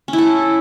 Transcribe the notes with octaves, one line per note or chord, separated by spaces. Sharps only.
C#4
E4
A4